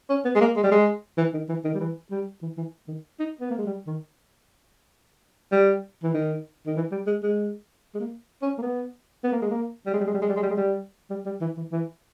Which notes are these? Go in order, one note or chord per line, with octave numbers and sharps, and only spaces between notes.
C#4
B3
G#3
A#3
G#3
G3
G#3
E3
D#3
E3
D#3
G3
E3
G3
E3
E3
D#3
D#4
B3
A#3
G#3
G3
D#3
G3
E3
D#3
D#3
E3
G3
G#3
G#3
G#3
A#3
C#4
A#3
B3
B3
A#3
G#3
A#3
G3
G#3
G3
G#3
G3
G#3
G3
G#3
G3
G#3
G3
G3
G3
E3
E3
E3